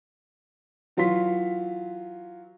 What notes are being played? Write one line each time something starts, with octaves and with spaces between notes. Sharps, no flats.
E3 F#3 F4 C6 B6